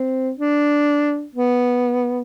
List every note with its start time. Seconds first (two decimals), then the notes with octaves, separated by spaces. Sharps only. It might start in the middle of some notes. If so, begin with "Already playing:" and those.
Already playing: C4
0.37 D4
1.35 B3